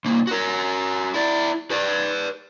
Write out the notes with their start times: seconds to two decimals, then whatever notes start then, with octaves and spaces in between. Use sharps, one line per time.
0.05 C2 A#3
0.27 F#4 A#4
1.14 E4 D5
1.71 B4 D5